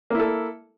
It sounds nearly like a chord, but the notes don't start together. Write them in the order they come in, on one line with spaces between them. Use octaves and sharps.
A#3 E4 A4